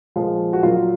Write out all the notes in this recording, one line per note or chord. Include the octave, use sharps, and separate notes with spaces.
A#2 F3 G#3 F4
F#4
A#2 F#3 A#3 F4